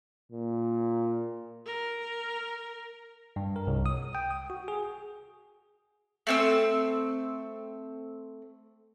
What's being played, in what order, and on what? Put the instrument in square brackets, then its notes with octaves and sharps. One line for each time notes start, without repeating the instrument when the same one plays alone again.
[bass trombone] A#2
[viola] A#4
[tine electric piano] G2
A#4
C2
D#6
G5
D#6
F#4
G#4
[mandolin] A3 C4 E6